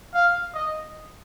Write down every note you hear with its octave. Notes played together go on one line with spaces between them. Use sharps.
F5
D#5